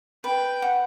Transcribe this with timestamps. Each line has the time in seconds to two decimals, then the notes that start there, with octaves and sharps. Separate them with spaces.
0.24 B4 G5
0.62 F#5